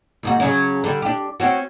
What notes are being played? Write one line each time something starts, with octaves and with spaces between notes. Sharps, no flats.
D#2 G#2 F#4
C#3 F#3 C#4
D3 G3
D4 G4
C4 C#4 F#4